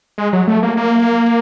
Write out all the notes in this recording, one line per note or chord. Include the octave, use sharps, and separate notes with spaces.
G#3
F#3
A3
A#3
A#3